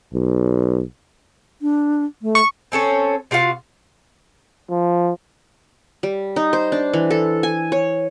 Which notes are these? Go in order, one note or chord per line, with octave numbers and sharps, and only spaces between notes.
B1
D4
A3
C#6
C4 C#4 A4 C#5
C3 F4 F#4 F5
F3
G3
D#4
C5
D4
E3
A4
G#5
C#5